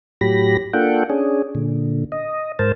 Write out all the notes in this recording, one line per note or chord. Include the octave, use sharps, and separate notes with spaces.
A2 F#3 G4 B5 A#6
A#3 D4 F4 A4 F#5 G5
C#4 D4 G#4
A#2 D3
D#5
G#2 A#4 C5 A5